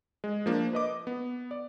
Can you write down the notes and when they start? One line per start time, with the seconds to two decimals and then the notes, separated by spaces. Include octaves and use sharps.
0.24 G#3
0.46 F3 A#3 D4
0.73 B4 D#5 D6
1.07 B3
1.51 D5